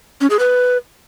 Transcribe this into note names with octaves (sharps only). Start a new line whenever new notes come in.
C#4
G#4
B4